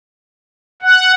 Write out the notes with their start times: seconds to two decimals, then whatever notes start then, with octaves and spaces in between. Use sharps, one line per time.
0.82 F#5